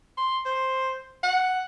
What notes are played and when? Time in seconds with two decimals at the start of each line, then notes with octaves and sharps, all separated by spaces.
0.17 C6
0.46 C5
1.23 F#5